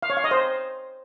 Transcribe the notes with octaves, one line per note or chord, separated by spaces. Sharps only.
F5
C#5
F5
D#5
C5